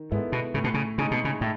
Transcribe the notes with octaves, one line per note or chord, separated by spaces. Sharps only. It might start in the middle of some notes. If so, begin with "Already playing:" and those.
Already playing: D#3
G#2 G#3 B3 E4 A4
B2
A2 C#3
B2
C#3
C#3 G#3 D#4 G#4
B2
C#3
A2